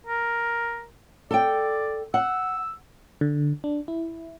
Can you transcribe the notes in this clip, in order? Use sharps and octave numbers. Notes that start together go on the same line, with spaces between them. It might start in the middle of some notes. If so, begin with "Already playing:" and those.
A#4
A4 D5 G5
F#5 E6
D3
D4
E4